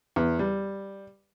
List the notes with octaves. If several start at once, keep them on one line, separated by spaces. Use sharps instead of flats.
E2
G3